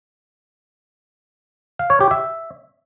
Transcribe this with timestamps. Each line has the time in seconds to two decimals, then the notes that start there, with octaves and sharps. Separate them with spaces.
1.79 F5
1.90 C#5
2.00 G4
2.11 E5